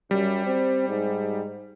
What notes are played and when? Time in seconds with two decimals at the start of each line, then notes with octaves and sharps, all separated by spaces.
0.11 F#2 G3
0.46 C4
0.88 G#2